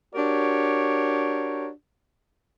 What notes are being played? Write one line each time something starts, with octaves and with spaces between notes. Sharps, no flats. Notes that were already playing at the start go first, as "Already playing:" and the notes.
D4 F#4 G4 A#4 C#5